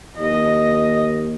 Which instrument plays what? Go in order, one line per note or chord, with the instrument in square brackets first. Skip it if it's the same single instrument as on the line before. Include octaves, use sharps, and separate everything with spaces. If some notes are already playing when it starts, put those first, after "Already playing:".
[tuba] D#2 [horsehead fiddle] D#5